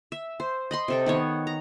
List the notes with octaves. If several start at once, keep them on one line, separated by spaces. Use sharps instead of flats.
E5
C5
D#5 B5 C6
C3 A4 G5
D#3 B3 C#5
A#5